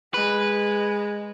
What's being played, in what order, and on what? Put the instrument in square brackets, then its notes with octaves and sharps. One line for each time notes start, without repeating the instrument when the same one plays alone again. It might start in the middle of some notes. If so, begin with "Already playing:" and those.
[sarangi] G#3 [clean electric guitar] B4